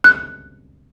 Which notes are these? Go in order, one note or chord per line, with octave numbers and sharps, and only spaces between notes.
F#6